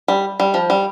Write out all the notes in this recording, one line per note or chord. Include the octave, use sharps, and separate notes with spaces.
G3
G3
F3
G3